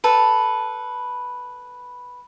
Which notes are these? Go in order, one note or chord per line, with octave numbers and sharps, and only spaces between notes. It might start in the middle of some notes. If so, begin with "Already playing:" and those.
A4 B4